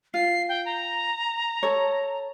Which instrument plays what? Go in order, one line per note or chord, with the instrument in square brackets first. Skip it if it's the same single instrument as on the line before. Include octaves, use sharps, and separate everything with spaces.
[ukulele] F4 [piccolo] C7
[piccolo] G5
A#5
[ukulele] A4 C#5